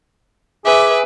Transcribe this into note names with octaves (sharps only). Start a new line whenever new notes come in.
G#4 B4 E5 D6